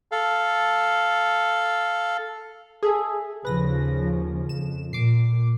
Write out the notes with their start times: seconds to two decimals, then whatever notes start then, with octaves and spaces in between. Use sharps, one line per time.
0.12 A4 F5
2.83 G#4 A4 E5
3.45 D#2 C#3 F3 B4 A#6
4.49 F2 E7
4.93 A#2 D6 C7